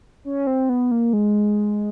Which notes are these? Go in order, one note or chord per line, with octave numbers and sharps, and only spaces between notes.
C#4
C4
B3
A#3
G#3